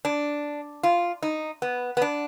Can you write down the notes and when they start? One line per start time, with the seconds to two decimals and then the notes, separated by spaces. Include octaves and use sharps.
0.05 D4
0.83 F4
1.23 D#4
1.62 B3
1.97 B3
2.02 D4